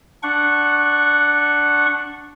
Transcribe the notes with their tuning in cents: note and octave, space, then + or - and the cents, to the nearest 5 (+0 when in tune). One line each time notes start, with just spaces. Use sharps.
D4 +0 F#5 +0 C#6 -15